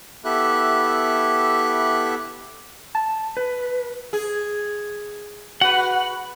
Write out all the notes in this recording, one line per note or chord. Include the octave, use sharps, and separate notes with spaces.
B3 E4 G4 A4 E5 F#6
A5
B4
G#4
F#4 B4 F#5